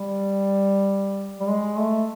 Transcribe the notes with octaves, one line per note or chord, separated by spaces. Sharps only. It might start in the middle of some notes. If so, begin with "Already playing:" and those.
Already playing: G3
G3
G#3
A3